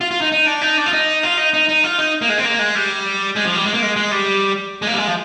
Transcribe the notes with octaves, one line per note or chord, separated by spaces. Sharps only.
F4
F4
D#4
D#4
D4
D#4
D4
F4
D#4
F4
D#4
D#4
D#4
F4
D#4
A#3
G#3
C4
A#3
G#3
G3
G#3
F3
G3
G#3
A#3
G#3
G#3
G3
G#3
A#3
G3
G#3
F3